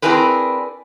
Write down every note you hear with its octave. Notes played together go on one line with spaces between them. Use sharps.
C4 D4 E4 G#4 A#4 B4